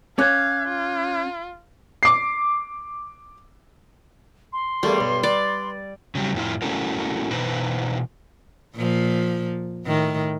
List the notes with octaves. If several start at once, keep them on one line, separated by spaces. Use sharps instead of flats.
C#4 F5 D6 F#6 G#6
F4
D6 C7
C6
E2 G3 A3 A#3
B1 G2
B4 D5
C#3 F#3 G3
F2 A2 B3 E4 F4
A3 C#4 E4 F#4 A4 A#4
B2 E3 D#4 B4 C5
A#2 F3
A2 D#3